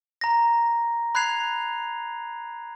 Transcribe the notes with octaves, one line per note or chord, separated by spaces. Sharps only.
A#5 A#6
B5 F#6 G#6 C7 F7